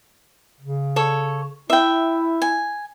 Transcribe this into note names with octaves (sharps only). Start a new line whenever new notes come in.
C#3
A4 C#5
E4 E5 G5
G#5